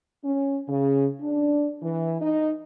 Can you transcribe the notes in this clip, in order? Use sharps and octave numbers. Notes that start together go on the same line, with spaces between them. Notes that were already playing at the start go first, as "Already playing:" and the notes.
C#4
C#3
D4
E3
D#4